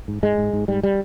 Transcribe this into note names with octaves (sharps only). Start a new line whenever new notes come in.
G#2
G#2 G#3
G#2
G#2
G#2 G3
G3